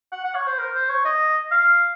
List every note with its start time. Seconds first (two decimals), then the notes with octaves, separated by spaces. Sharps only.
0.12 F#5
0.24 F#5
0.35 C#5
0.47 C5
0.59 A#4
0.75 C5
0.89 C#5
1.05 D#5
1.51 F5